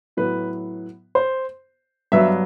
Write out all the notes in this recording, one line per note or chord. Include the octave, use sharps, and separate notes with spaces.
A2 F#3 B3 B4
C5
G2 F#3 B3 E5